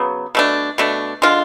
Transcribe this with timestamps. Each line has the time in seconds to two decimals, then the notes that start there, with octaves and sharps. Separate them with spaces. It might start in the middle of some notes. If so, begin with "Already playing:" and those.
Already playing: C#3 F#3 B3
0.35 B2 A3 D4
0.78 B2 A3 D4
1.22 D3 G#3 D4 F4